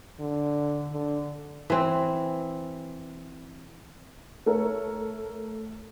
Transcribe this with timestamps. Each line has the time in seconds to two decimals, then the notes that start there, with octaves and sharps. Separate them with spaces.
0.20 D3
0.92 D3
1.70 E3 C4
4.46 A3 A4 A#4 C#5